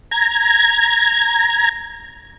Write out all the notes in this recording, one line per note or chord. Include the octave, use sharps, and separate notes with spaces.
A#5 G#6